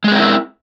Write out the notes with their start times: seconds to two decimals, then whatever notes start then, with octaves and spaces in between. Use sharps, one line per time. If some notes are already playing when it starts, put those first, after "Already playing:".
0.04 G#3
0.08 G#4
0.11 C4
0.15 A#4
0.19 E4